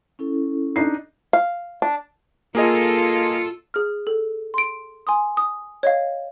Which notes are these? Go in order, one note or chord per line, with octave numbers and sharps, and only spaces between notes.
C#4 E4 A4
D4 D#4 C7
F5
D4
A#3 F4 G#4 A4 D#5
G#4 F6
A4
C6 D7
G#5 C6 D#6
D#6
C#5 D#5 F5